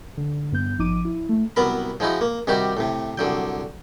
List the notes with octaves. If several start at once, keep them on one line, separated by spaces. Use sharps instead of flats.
D3
G2 B3 G6
G#1 F3 D#4 D6 D#7
E4
A3
C2 F#3 B3 A#4 B5
F3 G#3 D#4 E4 F#4
A#3
C3 D#3 G3 F#4 G4
A2 C3
C2 D3 F#3 G5